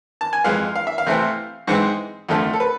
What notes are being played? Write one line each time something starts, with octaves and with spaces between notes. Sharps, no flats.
A5
G#5
F2 E3 G#3 F5
F5
E5
F5
C3 E3 A3 C4
G#2 E3 G#3 C4
F2 D3 F3 A3
A4
B4